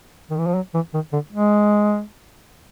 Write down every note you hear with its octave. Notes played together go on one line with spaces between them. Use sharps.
D#3
E3
F3
F#3
E3
D#3
D3
G#3